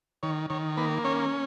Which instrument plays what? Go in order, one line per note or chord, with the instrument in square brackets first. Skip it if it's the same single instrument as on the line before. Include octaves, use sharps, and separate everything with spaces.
[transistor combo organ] D#3 C#5
D#3 C#5
A#3 B4
C#4 C#5